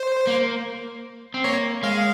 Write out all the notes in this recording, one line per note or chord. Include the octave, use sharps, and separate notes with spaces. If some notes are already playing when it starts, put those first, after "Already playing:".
Already playing: C5
A#3
C4
A#3 C#5
G#3 F5